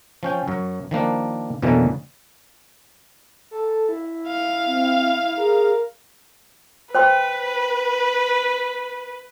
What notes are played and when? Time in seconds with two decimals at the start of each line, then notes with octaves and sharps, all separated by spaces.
0.23 F3 C#4 G5
0.48 F#2 F#3
0.91 D#3 F3 A#3 D4
1.62 F2 B2 D3 E3 F#3 A#3
3.51 A4
3.89 E4
4.28 F5
4.68 C4
5.38 G#4 A#4
6.95 B4 C5 G5 C6